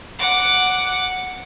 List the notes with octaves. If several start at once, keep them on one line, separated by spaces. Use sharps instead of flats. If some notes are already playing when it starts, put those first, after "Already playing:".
F#5 D6